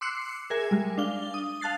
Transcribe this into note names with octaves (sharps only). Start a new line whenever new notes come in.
C6 D6 E6 F#6 C7 C#7
G#4 A#4 E5 G#5
G3 G#3
D4 F5 G7
D#6
F5 A5 F#6 A6 C7